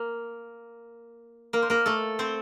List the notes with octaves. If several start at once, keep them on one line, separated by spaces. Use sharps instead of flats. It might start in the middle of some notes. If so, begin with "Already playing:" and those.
Already playing: A#3 A#4
A#3 A#4
C5
A#3 A#4
A3 A4
C4 C5